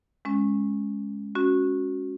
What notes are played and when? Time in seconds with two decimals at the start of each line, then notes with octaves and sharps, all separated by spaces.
0.25 G#3 C#4
1.35 C#4 F#4